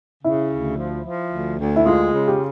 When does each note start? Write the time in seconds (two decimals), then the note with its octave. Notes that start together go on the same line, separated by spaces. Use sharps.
0.24 C#3 E4
0.51 D2
0.78 F3
1.05 F3
1.31 D2
1.58 D2
1.76 E4
1.85 G#3 F4
2.12 C#3
2.28 G4